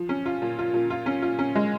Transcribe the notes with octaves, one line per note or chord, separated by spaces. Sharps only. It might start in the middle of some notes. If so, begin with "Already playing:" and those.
Already playing: F3
C#4
F4
A#2
F4
A#2
F4
C#4
F4
C#4
G#3